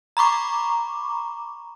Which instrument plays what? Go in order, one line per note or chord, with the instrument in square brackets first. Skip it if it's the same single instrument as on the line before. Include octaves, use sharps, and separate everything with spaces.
[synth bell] A#5 B5 C#6 D6